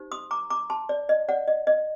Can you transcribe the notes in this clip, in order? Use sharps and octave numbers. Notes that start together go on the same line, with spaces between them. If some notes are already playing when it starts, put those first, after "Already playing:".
Already playing: D#4 G4 C5
C6 D#6
A#5 D6
A#5 D6
A5 C6
D5
D#5
D5 F#5
D#5
D#5